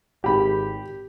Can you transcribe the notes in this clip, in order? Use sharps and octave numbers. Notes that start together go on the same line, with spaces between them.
G#1 G4 B5